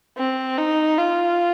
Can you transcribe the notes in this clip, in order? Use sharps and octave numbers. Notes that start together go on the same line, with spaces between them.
C4
D#4
F4